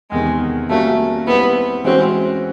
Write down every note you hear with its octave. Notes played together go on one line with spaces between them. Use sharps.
E2 C3 D#3 G#3
G3 A3 A#3 C#4 F#4
G3 B3 C4 E4
E3 G#3 C4 C#4 F#4